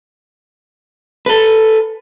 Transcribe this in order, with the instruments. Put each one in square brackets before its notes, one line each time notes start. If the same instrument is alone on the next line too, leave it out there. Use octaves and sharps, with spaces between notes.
[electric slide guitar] A4 B4